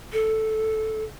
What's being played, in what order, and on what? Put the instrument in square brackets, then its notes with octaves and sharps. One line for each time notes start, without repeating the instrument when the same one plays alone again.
[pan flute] A4